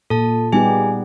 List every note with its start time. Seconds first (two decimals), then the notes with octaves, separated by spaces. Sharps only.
0.10 A#2 A4 A5
0.52 G3 B3 D#4 G4 G#4 G#5